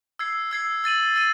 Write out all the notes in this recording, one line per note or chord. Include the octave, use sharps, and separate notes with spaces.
E6 G#6 C7
E6 G#6 C7
E6 A6 D#7 F#7
E6 A6 D#7